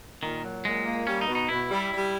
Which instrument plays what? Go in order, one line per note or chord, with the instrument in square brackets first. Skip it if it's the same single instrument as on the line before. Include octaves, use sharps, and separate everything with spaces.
[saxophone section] A#2 [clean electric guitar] D#3
[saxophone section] F#3
[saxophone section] A#2 [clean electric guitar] G#3
[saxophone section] A#3
[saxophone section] G3 [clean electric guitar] C#4
[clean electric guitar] D#4
[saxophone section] B2
[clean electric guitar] D#4
[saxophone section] B2 [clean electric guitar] E4
[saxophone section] G3
G3